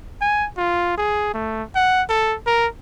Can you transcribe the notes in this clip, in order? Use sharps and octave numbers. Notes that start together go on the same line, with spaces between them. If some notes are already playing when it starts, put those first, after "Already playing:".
G#5
F4
G#4
A3
F#5
A4
A#4